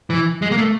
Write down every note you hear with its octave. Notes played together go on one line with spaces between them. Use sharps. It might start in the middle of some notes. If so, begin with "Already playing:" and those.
E3
G#3
A#3
A3